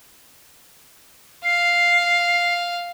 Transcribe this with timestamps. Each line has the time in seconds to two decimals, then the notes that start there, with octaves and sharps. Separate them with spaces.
1.44 F5 C7